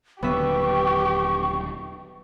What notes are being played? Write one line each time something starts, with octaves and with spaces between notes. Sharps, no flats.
D#1 D3 F#3 B3 G4 E5 C#6